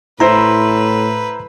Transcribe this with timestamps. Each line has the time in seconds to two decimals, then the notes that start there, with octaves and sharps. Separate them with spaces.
0.20 A2 E4 B4 C5 A#5